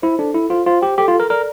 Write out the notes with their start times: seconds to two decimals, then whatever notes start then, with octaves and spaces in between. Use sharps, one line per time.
0.02 E4 C5
0.19 D4 A4
0.34 E4 A4
0.50 F4 C5
0.66 F4 C5
0.81 G4 G5
0.98 G4 A4
1.08 F4
1.14 A4
1.20 A#4
1.30 A#4 D5